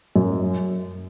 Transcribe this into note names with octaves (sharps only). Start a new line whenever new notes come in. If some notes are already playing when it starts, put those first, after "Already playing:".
F#2